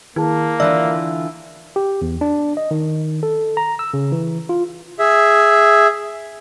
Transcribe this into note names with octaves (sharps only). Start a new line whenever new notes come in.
D#3 A#3 E4 G#4 A5
D3 E3 F4 D5 E5 E6
G4
E2
D4
D#5
D#3
A4
A#5
E6
C#3
E3
F4
G#4 E5